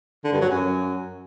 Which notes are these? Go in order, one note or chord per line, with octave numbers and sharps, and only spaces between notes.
D3
G2
F#3
F#2